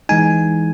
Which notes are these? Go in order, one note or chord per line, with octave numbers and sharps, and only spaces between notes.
E3 G#3 D#4 G#5